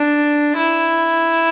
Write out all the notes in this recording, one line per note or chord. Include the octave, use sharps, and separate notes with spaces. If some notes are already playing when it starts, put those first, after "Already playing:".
Already playing: D4
E4